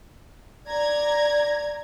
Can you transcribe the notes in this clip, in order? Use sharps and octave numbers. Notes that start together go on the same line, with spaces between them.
D5 A#5 G#6